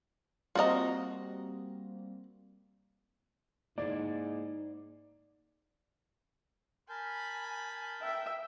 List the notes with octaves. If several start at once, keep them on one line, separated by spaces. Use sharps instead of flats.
G3 A#3 C4 F4 F#4 D5 D#5 A#5
G#2 A#3 D#4 E4 G#4 D5
A#4 G#5 A5 B5 G6
E5 G5